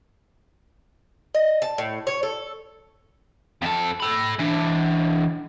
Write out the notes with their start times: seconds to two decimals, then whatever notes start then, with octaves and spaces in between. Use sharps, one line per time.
1.34 D#5
1.62 A5
1.78 A2
2.07 C#5
2.23 A4
3.62 F2 A4
4.00 A4 B5
4.39 E3 D4